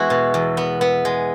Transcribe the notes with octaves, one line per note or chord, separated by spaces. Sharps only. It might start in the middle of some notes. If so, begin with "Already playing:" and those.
Already playing: E2 G#3 B3 E4 F#4
B2
E2
B3
B3
G#3